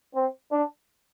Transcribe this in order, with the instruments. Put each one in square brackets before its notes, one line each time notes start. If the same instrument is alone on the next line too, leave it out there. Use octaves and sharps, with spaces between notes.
[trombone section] C4
D4